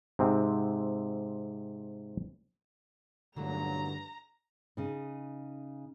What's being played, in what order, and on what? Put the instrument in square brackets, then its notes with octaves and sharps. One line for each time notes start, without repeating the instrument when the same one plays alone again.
[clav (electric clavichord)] G#2 C3 C4
[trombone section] B1 A#2 F#3 [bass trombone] G2 [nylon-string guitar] D3 E3 A3 [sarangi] A#5
[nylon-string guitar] C#3 D#4